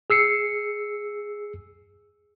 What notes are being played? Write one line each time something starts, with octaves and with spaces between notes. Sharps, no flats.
G#4 E6 C7 C#7